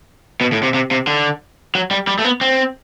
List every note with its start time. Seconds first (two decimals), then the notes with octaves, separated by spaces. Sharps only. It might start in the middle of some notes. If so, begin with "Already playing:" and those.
0.41 B2
0.53 A2
0.63 C3
0.74 C3
0.91 C3
1.07 D3
1.75 F#3
1.91 G3
2.07 G3
2.19 A3
2.24 B3
2.41 C4